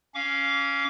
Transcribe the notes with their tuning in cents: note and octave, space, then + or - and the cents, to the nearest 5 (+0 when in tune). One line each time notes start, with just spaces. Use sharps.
C#4 +0 F5 -5 D6 -35